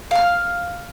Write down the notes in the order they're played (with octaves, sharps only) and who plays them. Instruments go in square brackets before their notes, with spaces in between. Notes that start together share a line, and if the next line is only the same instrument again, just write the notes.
[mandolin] F5 F6